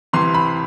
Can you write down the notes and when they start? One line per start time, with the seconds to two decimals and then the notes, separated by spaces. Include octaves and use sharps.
0.13 C2 C3 E3 C6
0.34 B5